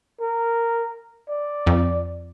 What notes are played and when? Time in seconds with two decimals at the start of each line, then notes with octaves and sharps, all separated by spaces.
0.20 A#4
1.29 D5
1.67 F2